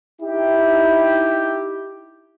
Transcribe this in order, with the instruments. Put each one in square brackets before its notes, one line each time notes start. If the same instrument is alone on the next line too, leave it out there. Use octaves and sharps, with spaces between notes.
[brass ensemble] D#4 E4 G4